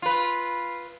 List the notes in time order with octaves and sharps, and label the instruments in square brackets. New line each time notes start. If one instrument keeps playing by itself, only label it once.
[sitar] F4 B4